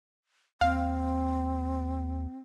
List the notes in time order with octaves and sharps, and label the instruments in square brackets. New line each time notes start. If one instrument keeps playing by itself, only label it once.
[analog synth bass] D#2 [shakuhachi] C4 [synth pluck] F5